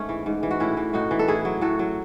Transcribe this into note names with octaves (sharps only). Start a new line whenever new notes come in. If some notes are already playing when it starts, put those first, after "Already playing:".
Already playing: G#2 A3 C#4
E3
G#2
E3
F#4
A2 C#4 E4
E3
A2 D#4 F#4
E3
A4
A2 E4 G#4
F#3
A2 F#4 A4
F#3